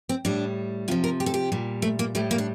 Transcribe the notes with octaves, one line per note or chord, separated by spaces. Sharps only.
C4
A2 G3 D4
C3 F3 F4
A#4
G4
A4
G4
A#2 G3
A3
A#3
A2 G3 A3
A#3
D4